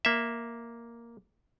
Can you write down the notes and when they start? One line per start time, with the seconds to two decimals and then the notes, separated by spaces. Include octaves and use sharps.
0.05 A#3 E5